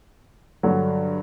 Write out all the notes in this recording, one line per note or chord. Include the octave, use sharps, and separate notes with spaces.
G2 D3 F#3